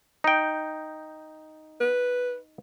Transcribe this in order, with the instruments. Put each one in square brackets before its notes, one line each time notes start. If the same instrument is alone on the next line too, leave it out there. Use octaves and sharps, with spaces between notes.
[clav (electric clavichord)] D#4 G5
[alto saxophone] B4